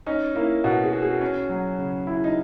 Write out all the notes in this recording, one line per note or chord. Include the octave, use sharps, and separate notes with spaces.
C#4 D#4
A#3 E4
B2 F#4
G#4
F#4
G#4
C#4
F#3
C#3
E4
D#4